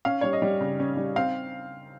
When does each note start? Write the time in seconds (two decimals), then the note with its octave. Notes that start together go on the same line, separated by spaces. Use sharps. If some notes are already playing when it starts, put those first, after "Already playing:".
0.05 C#4 F5
0.21 G3 C#5
0.33 D#5
0.42 G3
0.61 C#3
0.80 C#4
0.97 G3
1.16 C4 F5